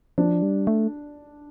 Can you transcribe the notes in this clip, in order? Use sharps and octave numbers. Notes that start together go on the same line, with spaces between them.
F3 D4
G3
A3